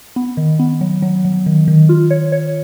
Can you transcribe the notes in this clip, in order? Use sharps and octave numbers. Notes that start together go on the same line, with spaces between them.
B3
D#3
B3
F#3
F#3
F#3
D#3
D#3
F4
C#5
C#5